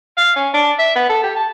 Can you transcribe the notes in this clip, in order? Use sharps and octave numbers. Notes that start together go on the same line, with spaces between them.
F5
C#4
D4
E5
B3
A4
G4
A5